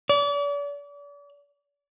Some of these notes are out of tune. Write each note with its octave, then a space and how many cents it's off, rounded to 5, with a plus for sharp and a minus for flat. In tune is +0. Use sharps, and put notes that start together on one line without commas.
D5 -40